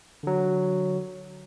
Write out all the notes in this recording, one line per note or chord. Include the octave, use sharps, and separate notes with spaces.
D3 F#3